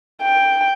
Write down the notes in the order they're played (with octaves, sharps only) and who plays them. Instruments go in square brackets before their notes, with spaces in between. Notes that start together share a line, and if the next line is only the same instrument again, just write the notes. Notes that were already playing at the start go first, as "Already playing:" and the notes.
[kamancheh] G5